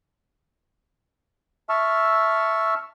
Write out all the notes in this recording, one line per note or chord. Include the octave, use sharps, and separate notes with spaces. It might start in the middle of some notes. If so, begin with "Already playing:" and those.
E5 A5 C#6 E6 F6